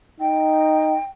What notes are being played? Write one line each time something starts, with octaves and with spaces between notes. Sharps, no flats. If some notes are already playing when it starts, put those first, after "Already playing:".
D#4 G5